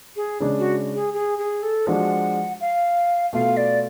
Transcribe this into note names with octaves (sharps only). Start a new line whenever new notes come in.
G#4
C#3 G#3 D4
F#4
G#4
G#4
G#4
A4
F3 G#3 D4 F#4 F#5
F5
B2 A3 F4 F5
D5